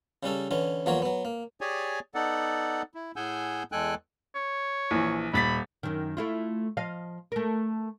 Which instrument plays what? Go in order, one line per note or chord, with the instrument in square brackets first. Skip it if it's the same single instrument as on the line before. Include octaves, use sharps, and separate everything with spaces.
[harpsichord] C#3 G3 C#4 A4
D3 E3 C#4
E2 F3 F#3 A#3 F#4 C#5
F#3 B3
A#3
[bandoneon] G4 G#4 C#5 D5 G#5
B3 D#4 A4 D5 F#5
E4
A2 G#4 F#5 G#5 E6 G6
E2 G#3 A4 G5 G#5 F#6
[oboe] C#5
[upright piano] A#1 E3
[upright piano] D#1 A6 B6 [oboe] B5
[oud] F#2 D#3
A3 E4 F4
F3 D#5 F5
A3 A#4